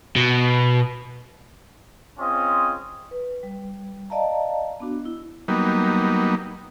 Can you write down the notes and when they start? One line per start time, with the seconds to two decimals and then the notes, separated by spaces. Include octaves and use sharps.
0.16 B2
2.19 C4 C#4 F4 G#4 D#5
3.11 B4
3.43 G3
4.10 D5 D#5 F5 A5 A#5
4.80 B3 D4 F#4
5.05 E4
5.48 F#3 G3 A#3 B3 D#4